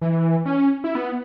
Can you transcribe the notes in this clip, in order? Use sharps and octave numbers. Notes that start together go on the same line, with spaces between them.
E3
C#4
E4
B3